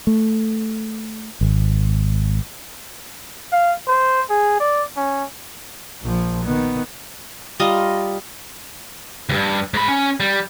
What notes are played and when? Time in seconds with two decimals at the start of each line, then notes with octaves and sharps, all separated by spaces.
0.07 A3
1.41 G#1
3.52 F5
3.87 C5
4.30 G#4
4.60 D5
4.97 C#4
6.03 A#1 F3
6.45 D#3 B3
7.60 G3 F4 D#5 A#5
9.29 D2 G2
9.74 G#2 B5
9.88 C#4
10.20 G3